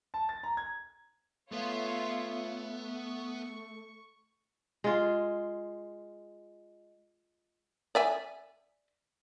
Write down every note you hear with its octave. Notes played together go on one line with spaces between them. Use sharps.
A5
A6
A#5
G#6
A3 B3 F4 C#5 E5
C#6
G#3 F4
D5 E5 G#5